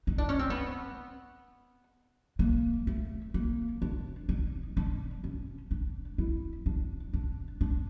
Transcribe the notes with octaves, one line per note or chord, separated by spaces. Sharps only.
D#4
D4
C#4
C4
B3
A#3
A3
A#3
D4
D#4
D4
C#4
D4
E4
D4
D4
D4